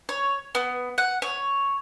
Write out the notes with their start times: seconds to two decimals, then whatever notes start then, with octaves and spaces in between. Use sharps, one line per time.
0.09 C#5
0.55 B3
0.98 F#5
1.22 C#5